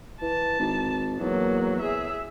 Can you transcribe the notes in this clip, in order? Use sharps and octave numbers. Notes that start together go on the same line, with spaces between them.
E3 A5
G#1
E2 F#3 A#3
G#4 E5